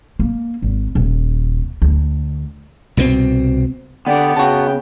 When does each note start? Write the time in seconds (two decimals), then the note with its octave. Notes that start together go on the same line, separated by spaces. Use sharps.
0.19 A#3
0.62 G#1
0.95 D#1
1.82 D2
2.97 C2 B2 D3 C4
4.07 D3 B3 G4 D5 F#5
4.37 C#3 F#4 G5 A5